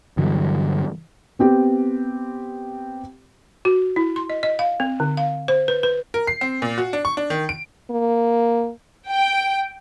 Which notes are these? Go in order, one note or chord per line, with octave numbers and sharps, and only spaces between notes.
G2 D3 E3 F#3
B3 C4 G4
F#4
E4
C6
D#5
D#5
F5
C4
D3
F5
C5
B4
B4
A#4
C7
C4
A#2
F#4
D4
C#6
D4
D#3
D7
A#3
G5